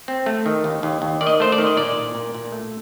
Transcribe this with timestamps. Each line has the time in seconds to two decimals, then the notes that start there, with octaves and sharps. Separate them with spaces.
0.08 C4
0.26 A3
0.46 D#3
0.64 D#2
0.83 D#2
1.02 D#2
1.21 D#3 D5
1.27 D#5
1.40 A3 C5
1.52 D5
1.58 D#3
1.67 D#5
1.77 A#2 D5
1.97 A#2
2.15 A#2
2.35 A#2
2.52 A3